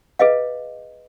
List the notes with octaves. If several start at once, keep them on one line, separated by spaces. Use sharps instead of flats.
G#4 B4 D#5 F5